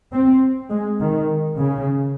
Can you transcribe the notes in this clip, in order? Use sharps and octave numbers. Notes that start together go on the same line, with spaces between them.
C4
G#3
D#3
C#3